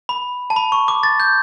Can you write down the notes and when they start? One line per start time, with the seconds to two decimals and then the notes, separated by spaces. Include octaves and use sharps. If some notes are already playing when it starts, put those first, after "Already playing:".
0.09 B5
0.50 A5
0.56 B5
0.72 C#6
0.88 D6
1.03 A6
1.20 G6